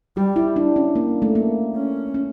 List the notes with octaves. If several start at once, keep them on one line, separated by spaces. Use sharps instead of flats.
G3 G4
E4
D4
C#4
A#3
A3
A#3
C#4
C#4